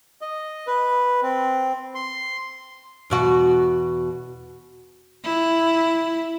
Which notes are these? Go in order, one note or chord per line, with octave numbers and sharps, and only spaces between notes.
D#5
B4
C4
C6
E2 B2 F#4
E4